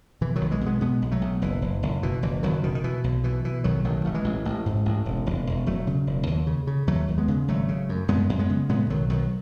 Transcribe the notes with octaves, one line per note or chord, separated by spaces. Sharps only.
B2 E3
D#3 F#3
B1
E3 G#3
B2
G#3 B3
B2 G#3 B3
B1
F#3 A3
B1
F#1 E3
F#1
F#1
B2 E3
F#1 E3
F#1 D#3 F#3
B2 D#3
D#3
B2 E3
B1
B2 E3
B2 E3
B1 D#3 F#3
A1 D#3 F#3
A1 A3
E3 G#3
A1
A1
G#2
A1
E1
E1
E1
E1 F#3 A3
C#3
E1
D#2
C#3
C#3
D#2 F#3 A3
D#2
G#3 B3
C#3
G#1 F#3 A3
C#3
F#2
F#2 G#3 B3
F#2
G#3 B3
C#3
A2 G#3 B3
B1 D#3 F#3
B1 D#3 F#3